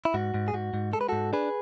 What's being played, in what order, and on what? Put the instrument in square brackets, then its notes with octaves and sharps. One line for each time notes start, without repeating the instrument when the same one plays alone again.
[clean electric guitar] E4
G#2 F#4
G#2
G#4
G#2 F#4
G#2
G#3 A4
B4
G#2 F#4 A4
D4 G#4 B4